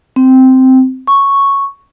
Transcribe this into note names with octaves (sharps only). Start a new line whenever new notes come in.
C4
C#6